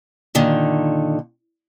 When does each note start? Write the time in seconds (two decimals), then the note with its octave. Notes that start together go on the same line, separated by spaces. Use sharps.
0.35 A#2 D3 D#3